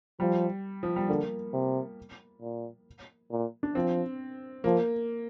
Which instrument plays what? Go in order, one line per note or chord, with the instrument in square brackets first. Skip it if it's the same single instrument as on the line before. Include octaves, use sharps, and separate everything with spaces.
[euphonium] F3 [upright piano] G3
[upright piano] F3
G3
[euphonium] D3 [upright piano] A#3
[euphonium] C3
A#2
A#2
[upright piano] D4
[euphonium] F3 [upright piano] C4
[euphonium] F3 [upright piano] A#3